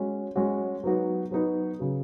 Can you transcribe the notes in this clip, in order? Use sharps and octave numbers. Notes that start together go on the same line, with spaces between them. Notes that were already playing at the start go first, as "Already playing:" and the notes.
Already playing: G#3 C#4 F#4
G#3 C#4 F#4
F#3 B3 D#4 F#4 B4
F#3 B3 D#4 F#4 B4
C#3 F#3